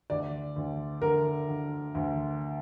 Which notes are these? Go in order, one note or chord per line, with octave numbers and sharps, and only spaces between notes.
D2 D5
D2
D3 A#4
D3
D2